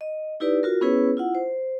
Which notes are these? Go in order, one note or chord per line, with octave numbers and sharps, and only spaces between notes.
D#5
D#4 E4 G4 B4 D5
F4 F#4 A#4
B3 C#4 E4 G#4 B4 C#5
E4 F4 F#5
C5